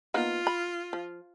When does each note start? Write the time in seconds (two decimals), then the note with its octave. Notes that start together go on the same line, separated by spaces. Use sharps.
0.14 A#3 B3 D#4 F4
0.47 B5
0.93 F3